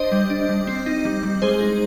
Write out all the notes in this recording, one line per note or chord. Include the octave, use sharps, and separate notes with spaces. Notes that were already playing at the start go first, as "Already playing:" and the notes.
Already playing: D4 C5 D#5
G3
D4
G3
C4
D#4
G3
G3
G#3 G#4 C5
D#4